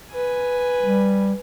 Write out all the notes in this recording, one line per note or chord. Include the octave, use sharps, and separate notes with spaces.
B4 G#5
G3